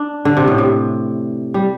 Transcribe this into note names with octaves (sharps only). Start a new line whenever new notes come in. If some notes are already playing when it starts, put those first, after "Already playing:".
Already playing: D4
D3
C3
A2
C3
G3